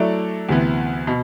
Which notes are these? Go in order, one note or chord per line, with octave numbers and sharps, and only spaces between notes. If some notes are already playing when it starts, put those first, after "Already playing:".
Already playing: F#3 A3 E4 A4 D5
D2 C3 E3 B3
B2